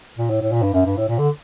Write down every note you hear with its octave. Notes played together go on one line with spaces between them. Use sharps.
A#2
A2
A2
A#2
G2
F#2
G2
A2
A#2
D3